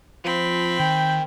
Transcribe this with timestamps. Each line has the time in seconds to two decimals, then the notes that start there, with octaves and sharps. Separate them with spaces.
0.24 F3 C4 B5
0.79 D#3 G5 G6